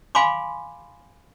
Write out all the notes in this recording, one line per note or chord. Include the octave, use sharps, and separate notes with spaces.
F5 G#5 B5 C6 D6